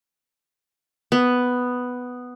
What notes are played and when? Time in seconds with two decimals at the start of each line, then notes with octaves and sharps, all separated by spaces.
1.12 B3